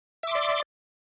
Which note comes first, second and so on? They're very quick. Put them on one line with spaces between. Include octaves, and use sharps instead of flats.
E5 D6 C6 D5